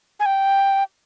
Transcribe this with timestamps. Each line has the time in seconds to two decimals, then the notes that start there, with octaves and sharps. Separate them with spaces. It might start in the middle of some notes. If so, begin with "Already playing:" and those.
0.20 G#5
0.26 G5